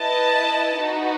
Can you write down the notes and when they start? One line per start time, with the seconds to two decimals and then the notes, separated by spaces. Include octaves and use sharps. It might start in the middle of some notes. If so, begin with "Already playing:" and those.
Already playing: E4 B4 D#5 A5
0.79 D#4 F#4 B4